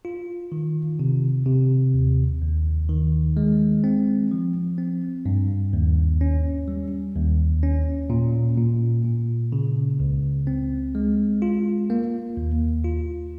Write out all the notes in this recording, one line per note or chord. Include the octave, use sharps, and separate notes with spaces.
F4
D#3
C3
C3
D#2
D#2
D#3
G#3
C4
F3
C4
G2
D#2
C#4
G3
D#2
C#4
A#2
A#2
A#2
C#3
C#2
C4
G#3
F4
A#3
D#2
F4